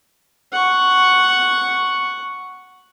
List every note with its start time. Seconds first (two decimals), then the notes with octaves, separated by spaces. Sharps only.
0.53 F#5 C#6